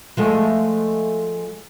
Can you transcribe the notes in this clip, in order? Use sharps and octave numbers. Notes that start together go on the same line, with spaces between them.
F3 G#3 A3